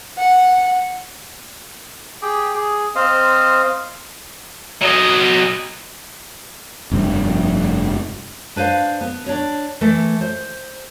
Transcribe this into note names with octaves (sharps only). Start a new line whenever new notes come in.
F#5
G4 G#4 G5
G#4
C4 C5 D#5 F5
F#3 D#5
F1 G2 F3
D4 B4 C5 F5
B3
D4 C#5
E3 A3
C5